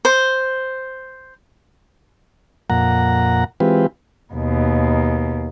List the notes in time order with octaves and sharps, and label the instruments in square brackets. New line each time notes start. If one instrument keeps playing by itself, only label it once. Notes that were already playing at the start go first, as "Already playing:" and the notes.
[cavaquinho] C5
[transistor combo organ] F2 A#2 F#5 A#5
E3 G#3 C4 F4 G4 B4
[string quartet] D#2 B2